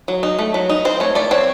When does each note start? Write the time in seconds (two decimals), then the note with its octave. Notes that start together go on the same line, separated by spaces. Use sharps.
0.08 F#3
0.23 D#4
0.39 A3
0.54 F#3
0.69 D#4
0.85 C4 C5
1.00 A3 C#5
1.15 A3 D5
1.31 C4 C#5